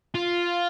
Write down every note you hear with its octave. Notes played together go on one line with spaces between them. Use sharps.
F4